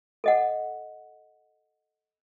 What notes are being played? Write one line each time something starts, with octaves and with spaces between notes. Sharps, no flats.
A4 D#5 F#5